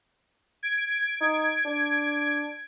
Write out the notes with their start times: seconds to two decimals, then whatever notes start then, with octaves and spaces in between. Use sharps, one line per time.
0.63 G#6 D7
1.21 D#4
1.65 D4